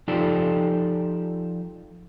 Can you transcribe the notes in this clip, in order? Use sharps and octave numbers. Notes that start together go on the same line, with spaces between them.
F3 D#4 F4 G4 A4 D5